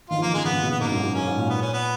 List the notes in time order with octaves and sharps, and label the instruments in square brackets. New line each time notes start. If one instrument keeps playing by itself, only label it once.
[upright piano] D#3 [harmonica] F4
[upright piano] F3
[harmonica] A#3
[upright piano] D#3
[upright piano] C#3 [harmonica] G#3
[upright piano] D#3 [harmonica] B3
[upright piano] C#3
B2
[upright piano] A#2 [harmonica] B3
[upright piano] G#2 [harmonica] A#3
[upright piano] F#2
F#2
[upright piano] F#2 [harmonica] C#4
[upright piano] G#2
A#2
[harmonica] B3
C#4
B3